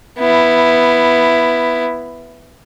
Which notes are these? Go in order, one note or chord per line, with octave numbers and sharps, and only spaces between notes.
B3 E4